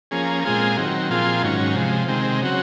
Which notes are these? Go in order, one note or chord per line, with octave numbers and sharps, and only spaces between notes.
F3 A#3 C#4 G#4
A#2 G#3 C4 F4 G#4
D#3 F#3 C4
A#2 F3 C4 F4 G#4
G#2 D#3 F#3 C#4
C3 F3 G#3
C3 D#3 G#3 C4
C#3 F#3 C4 F#4